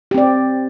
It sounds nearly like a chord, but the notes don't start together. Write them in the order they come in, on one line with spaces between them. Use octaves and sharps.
G4 C4 D5